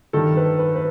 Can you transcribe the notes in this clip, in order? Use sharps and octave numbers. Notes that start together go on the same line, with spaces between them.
G2 D#3 A4
B4
B4
B4